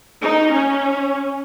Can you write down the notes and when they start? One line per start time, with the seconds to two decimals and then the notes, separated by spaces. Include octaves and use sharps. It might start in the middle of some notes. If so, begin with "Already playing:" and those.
0.22 D#4
0.52 C#4